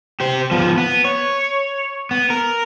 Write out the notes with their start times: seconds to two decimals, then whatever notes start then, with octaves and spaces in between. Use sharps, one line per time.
0.20 G4 C5
0.51 F3 B3
0.78 B3
1.04 C#5
2.11 B3
2.30 A#4